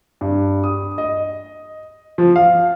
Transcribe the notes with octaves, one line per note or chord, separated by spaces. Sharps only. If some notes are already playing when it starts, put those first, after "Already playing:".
G2
D#6
D#5
F3
F5